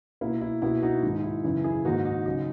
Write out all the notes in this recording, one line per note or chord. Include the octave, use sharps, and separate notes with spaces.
B2 A#3 E4
E4
B2 A#3 E4
D#4 F#4
G#2 D#3 G#3 D#4
E4
F#2 C#3 E3 E4
E4 G#4
G#2 D#3 A#3 D#4 F#4
D#4
C#3 F#3 D#4